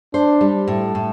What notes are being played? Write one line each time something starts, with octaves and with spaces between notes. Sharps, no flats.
D4 C5
G3
A2
A2